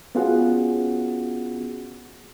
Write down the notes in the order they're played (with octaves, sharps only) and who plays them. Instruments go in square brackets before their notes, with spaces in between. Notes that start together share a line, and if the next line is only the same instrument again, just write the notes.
[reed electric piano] B3 C#4 F4 F#4 G#4 F#5